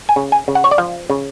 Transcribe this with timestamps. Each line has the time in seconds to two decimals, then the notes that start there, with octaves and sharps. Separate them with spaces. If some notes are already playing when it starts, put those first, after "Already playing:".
0.09 G#5
0.16 C#3
0.32 G#5
0.48 C#3
0.55 F#5
0.64 C#5
0.71 D5
0.78 F3 F5
1.10 C#3